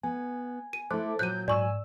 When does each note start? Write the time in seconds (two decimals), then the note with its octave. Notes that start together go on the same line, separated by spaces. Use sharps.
0.03 B3 G#5
0.73 D#7
0.91 A3 E4 C5 A5 D6 F#6
1.19 A#2 F#3 F#6 G6 D#7
1.48 G#2 D5 G#5 C#6 E6